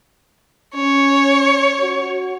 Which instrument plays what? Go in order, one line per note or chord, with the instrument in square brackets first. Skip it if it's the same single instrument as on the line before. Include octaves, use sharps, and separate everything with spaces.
[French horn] C#4 [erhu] C#5
[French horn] F#4